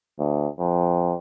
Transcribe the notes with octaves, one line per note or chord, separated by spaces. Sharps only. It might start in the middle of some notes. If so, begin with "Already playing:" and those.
D2
F2